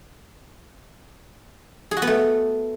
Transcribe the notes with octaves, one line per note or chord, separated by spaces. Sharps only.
G#4
F#4
B3
A3